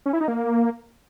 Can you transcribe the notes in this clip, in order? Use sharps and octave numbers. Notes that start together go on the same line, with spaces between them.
C#4
E4
D#4
A#3